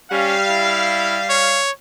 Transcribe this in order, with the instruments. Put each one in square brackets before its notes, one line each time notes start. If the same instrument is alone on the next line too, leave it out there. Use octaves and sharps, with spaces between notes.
[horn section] G3 F5 [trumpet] C#4
[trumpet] E4
C#5